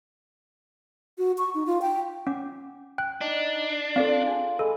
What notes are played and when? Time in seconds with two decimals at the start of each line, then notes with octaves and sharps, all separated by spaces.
1.18 F#4
1.38 C#6
1.54 D#4
1.67 F4
1.82 G5
2.27 C#4 F#5 D6
2.98 G5 F#6
3.21 D4 D#4
3.96 C4 F4 A4 D5 F5
4.27 D4 G#4 A5
4.59 G#3 G#4 A4 B5